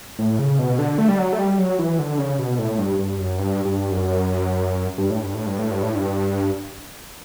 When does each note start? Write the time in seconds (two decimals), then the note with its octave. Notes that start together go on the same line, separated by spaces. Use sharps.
0.19 A2
0.39 C#3
0.59 B2
0.79 D3
0.98 A3
1.08 G3
1.19 F#3
1.33 A3
1.39 G3
1.59 F#3
1.79 E3
1.99 D3
2.19 C#3
2.39 B2
2.59 A2
2.78 G2
2.99 G2
3.18 F#2
3.39 G2
3.65 G2
3.91 F#2
4.98 G2
5.10 A2
5.22 G2
5.34 A2
5.47 G2
5.59 A2
5.71 G2
5.83 A2
5.95 G2